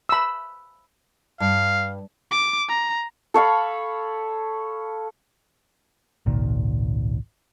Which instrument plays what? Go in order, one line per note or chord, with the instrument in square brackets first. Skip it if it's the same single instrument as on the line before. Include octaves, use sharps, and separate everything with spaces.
[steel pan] B5 E6
[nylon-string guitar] G2 [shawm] F5
[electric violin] D6
A#5
[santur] A4 C#5 F5 B5
[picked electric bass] G#1 C#2 A#2 D#3